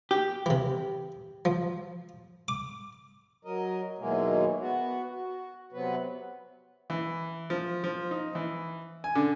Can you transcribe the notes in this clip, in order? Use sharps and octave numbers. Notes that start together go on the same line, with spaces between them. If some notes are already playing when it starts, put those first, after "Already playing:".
G4
C3 E3
F3
D6
F#3 A#4 D#5
D#2 B2 E3 F#3 G#3 A#3
B3 F#4
F#4
C3 F#3 B3 B4
E3
F3
F3
D#4
E3
G#5
D3